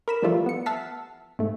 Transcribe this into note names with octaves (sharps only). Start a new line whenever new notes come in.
A#4 B5 E7
E3 F3 G3 A3 F4
B3 C#7
E5 F#5 A5 F6 B6 C7
G#2 A3